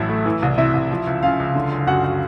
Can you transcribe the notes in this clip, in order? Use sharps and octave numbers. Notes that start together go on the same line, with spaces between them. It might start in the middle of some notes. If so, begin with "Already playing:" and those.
Already playing: A1 A2 F#3 E4 E5
A3
E3
C2
C3 E4 E5
C2
F3
C#2
C#3 F4 F5
C#2
D3
F#1
F#2 F#4 F#5
F#4 F#5